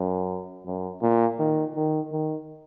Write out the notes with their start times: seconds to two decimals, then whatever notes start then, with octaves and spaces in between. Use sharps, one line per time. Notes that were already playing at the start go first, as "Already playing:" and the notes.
Already playing: F#2
0.66 F#2
1.02 A#2
1.39 D#3
1.75 D#3
2.12 D#3